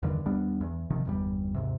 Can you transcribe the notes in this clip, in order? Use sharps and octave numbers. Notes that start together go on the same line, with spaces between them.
E2 G2 D3 D#3
D#2 G3 B3 D4
E2
G#1 C3 D#3 F3
G1 E2 G3
D#2 G#2 C3